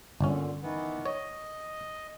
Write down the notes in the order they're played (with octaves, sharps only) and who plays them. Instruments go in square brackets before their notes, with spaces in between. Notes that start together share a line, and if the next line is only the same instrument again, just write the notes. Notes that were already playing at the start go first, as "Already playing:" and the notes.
[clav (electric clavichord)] G1 C#4 [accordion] A#2 D3
[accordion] D#3 E3 B3
[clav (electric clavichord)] C#5 [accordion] D#5